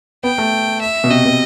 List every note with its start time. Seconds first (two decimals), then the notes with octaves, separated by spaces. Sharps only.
0.24 B3 G5
0.38 A3
0.81 E5
1.04 B2
1.11 C3 D#5
1.25 B2